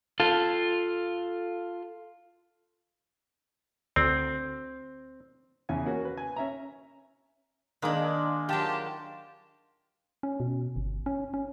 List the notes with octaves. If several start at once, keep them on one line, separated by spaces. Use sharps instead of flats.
F4 A4
D2 C4
E2 C#3 G#5
A#3 C#4 F#4 F#5
B4
G#5
C#4 E5 A#5
D#3 G#3 A#3 D4
F#3 F4 G4 A5
C#4
B2
G1
C#4
C#4